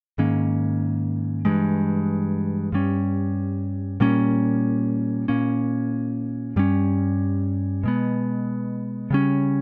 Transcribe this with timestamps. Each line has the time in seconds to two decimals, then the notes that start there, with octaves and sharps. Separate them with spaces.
0.18 G#2 D#3 A#3 C#4
1.45 G2 E3 G#3
2.72 G2 G3 C#4
4.00 A#2 G3 A#3 C#4
5.28 A#2 A#3 C#4
6.56 G2 G3 C#4
7.84 B2 G#3 B3
9.10 C#3 G3 C#4